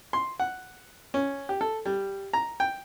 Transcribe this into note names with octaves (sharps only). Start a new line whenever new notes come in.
C6
F#5
C#4
G4
A4
G3
A#5
G5